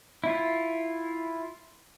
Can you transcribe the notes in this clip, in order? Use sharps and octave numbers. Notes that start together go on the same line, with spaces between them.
E4 F4